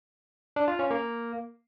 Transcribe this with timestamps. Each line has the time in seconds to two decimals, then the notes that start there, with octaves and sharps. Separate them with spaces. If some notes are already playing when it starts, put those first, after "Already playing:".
0.56 D4
0.68 F4
0.79 C#4
0.91 A#3